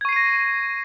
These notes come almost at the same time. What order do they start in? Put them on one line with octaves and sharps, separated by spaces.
G#6 C#6 C7 D#7 A#6